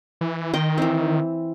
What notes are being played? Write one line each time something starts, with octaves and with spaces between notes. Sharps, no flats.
E3
D#3 D#5 G5 C6
E3 C4